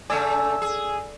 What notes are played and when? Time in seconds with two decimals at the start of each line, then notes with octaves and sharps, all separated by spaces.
0.10 C#3 A3 D5 G#5 E6
0.62 G#4